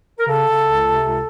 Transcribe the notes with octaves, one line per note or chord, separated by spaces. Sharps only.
A#4
C#3 A4
C#3
C#2
C3
C#2